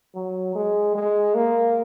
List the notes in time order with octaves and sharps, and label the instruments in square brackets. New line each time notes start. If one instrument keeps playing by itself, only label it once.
[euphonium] F#3
G#3
G#3
A#3